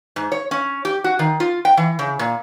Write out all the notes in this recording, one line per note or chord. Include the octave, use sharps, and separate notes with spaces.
G#2
C#5
C#4
G4
F#4
D#3
F4
G5
E3
C#3
A#2